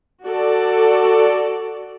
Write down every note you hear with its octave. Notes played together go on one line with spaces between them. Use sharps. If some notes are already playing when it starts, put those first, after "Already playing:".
F#4 A4 D5